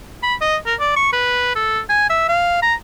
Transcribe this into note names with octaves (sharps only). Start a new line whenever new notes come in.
B5
D#5
A#4
D5
C#6
B4
A4
G#5
E5
F5
A#5